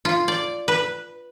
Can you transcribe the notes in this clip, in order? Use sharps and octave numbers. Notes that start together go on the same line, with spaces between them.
F4
D5
B4